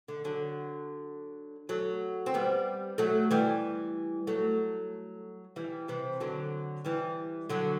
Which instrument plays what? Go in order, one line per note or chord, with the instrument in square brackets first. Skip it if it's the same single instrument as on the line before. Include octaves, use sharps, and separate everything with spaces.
[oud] D3
D3 F#3
F#3 A3
C4
G3 B3
F#3 A3
E3 G3
F#3 A3
E3 G3
C3 E3
D3 F#3
E3 G3
D3 F#3